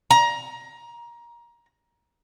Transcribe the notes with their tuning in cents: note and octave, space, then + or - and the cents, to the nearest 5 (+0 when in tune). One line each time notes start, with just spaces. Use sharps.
A#5 +20